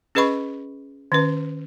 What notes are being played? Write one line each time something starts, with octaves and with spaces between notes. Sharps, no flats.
C#4 G#4 B4 D#5 B5 C#6
D#3 C#4 B4